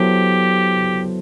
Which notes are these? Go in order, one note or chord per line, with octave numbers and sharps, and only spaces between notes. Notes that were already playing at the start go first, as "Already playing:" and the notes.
Already playing: F#3 B3 E4 G4 A4 C5